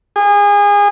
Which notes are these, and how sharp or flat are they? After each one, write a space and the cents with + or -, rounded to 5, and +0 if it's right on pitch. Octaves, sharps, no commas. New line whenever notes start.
G#4 -30